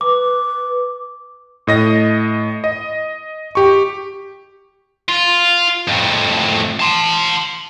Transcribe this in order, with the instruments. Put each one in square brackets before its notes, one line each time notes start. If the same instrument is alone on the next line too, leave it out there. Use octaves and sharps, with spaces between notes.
[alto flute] B4 [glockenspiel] D6
[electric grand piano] A2 D#5 A#6
D#5
G4 C#6
[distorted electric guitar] F4
F2 A2
A5 C6